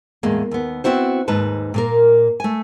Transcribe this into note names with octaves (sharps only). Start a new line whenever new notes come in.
E2 A2 G#3 A#3
D#2 B3
B3 C4 E4 F#4 C5
D#2 G#2 D#4 B4 A5
A#2 A#3 A#4
A3 G#5